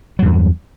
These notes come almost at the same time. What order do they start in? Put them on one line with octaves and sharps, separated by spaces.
F#3 G2 E2